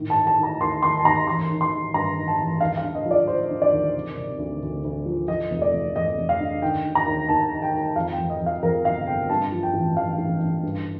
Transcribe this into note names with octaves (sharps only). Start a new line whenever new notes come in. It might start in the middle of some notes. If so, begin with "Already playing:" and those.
Already playing: A2 D#3
A5
D#3
A5
D#3
A#5
D#2 C6
D#2 C6
A5
D#2 A#5
A1 C6
D#3
C6
D#3
G2 A#5
D#3
A5
A1
D#2 F5
F5
D3
D#5
F3
D5
F3 C5
D3
D5
D#2
C3
C3
D2
D2
D2
F3
F3 D#5
F1
D5
F1
F1 D#5
F1
F5
D3
D#3 G5
D#3
A#5
D#2
D#2 A5
D#3
G5
D#3
F2 F5
G5
F2
D#5
F2
F5
F2 A#4
G1 F5
C3 G5
G2 A5
F3
G5
A1
A1 F5
A1
A1
G2